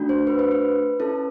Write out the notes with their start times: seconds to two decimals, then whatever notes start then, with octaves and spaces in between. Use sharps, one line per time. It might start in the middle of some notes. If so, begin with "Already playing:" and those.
Already playing: A3 D4 F#4
0.09 C5
0.27 B4
0.39 C5
0.51 B4
1.00 C#4 E4 A4